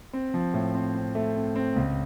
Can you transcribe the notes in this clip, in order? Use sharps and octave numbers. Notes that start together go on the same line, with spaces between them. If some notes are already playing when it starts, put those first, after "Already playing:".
C4
F3
A2
C4
C4
A3
C4
C4
C#2